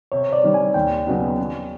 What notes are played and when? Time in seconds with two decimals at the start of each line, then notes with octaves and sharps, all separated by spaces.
0.12 C3 C#5
0.33 D5
0.43 D#3 G3
0.54 G#5
0.74 D#2 G5
1.06 C#3 F#3 B3 D#4
1.39 C#3